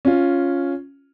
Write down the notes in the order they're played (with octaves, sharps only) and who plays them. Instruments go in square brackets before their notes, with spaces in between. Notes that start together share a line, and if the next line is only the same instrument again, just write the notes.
[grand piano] C#4 F4